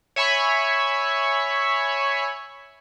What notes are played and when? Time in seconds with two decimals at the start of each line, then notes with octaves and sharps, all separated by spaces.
0.16 C#5 E5 G#5 B5 C#6